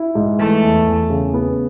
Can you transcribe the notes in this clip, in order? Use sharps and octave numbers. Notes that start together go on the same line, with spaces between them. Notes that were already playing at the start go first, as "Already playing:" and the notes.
Already playing: E4
G#2
E3 A3
E2
E2
C#3
B3